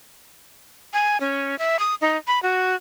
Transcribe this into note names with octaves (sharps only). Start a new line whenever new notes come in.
G#5
C#4
E5
D#6
D#4
B5
F#4